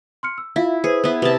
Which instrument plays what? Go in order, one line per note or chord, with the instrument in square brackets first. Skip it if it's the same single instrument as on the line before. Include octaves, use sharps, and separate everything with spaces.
[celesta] C6 F6 C#7
E6
[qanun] E4 [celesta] F4 E5 F5
[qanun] G#4 [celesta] B4 C5
[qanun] B3 E4
[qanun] C3 A5 [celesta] B4